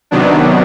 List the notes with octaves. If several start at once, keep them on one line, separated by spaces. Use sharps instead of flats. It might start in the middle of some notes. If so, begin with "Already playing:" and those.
C3 D#3 F#3 B3 D4